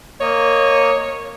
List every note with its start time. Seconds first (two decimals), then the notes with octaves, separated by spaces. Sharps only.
0.21 A#3 C#5 D#5